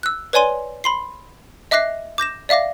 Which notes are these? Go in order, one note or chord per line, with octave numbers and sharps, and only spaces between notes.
E6 F#6
B4 C#5 D5 G#5 C6 D#7
B5 C6 C7
D#5 E5 D6 F#6 A#6 C7
D6 G6 A#6 E7
D5 E5 F5 D6 A#6